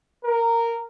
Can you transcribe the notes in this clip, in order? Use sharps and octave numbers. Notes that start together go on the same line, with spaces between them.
A#4